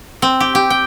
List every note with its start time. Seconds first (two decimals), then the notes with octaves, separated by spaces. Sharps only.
0.22 C4
0.40 G4
0.55 G4
0.70 G5